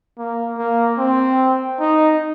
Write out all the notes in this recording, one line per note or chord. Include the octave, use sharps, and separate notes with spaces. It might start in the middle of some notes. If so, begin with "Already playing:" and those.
A#3
A#3
C4
D#4